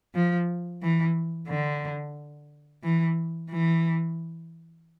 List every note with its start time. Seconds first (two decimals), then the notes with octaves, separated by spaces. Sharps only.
0.15 F3
0.83 E3
1.48 D3
2.83 E3
3.50 E3